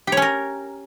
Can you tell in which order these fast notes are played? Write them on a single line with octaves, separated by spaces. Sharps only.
G4 C#5 C#4 A#4